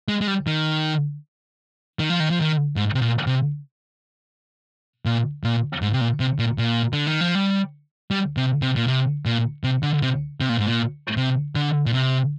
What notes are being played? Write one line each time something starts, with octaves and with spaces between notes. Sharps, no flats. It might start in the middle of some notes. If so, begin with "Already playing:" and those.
G#3
G#3
G3
D#3
D#3
F3
D#3
F3
D#3
G#2
C3
A#2
C3
A#2
A#2
G#2
C3
A#2
C3
A#2
A#2
D3
D#3
F3
G3
G3
C3
C3
A#2
C3
A#2
C3
D3
C3
C3
A#2
G#2
A#2
C3
D3
A#2
C3